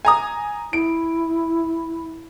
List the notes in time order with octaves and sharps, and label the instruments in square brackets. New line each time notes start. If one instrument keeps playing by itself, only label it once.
[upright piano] G#5 A#5 D#6
[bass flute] E4 [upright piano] D7